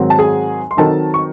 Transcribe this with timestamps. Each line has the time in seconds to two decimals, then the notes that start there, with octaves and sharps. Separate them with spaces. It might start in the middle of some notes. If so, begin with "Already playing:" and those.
Already playing: G#2 D#3 F#3 C4
0.10 A5
0.19 G#4 G#5
0.71 C6
0.77 D#3 F#3 C4 D#4 A4 A5
1.14 C#6